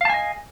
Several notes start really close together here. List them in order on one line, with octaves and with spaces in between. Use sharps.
F5 A5 G#5 D#5